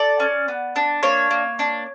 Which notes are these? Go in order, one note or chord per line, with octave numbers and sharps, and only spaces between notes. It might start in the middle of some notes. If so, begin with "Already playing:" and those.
Already playing: A4 D5
C#4
B3
D4
A#3 C#5
A#3
D4